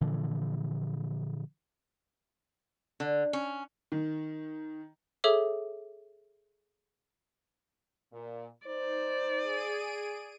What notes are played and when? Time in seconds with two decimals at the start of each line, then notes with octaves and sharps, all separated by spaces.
0.01 A#2 D3 E3 F3
3.00 D3
3.33 C#4
3.92 D#3
5.24 G#4 A4 C#5 E5 D6
8.13 A#2
8.67 D#4 C5 D5
9.37 G#4 D7 D#7